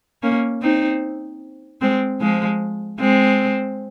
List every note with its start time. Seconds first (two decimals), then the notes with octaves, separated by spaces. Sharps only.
0.23 A#3 C#4
0.62 C4 D#4
1.81 G#3 C4
2.21 F3 G#3
3.00 G#3 C4